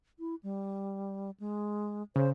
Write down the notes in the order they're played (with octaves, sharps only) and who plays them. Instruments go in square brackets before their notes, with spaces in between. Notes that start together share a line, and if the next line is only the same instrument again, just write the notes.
[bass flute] E4
G3
G#3
[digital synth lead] C#3 [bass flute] C5